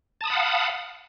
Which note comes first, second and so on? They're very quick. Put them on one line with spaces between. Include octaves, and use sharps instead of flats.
A5 D#6 B5 F#5 F5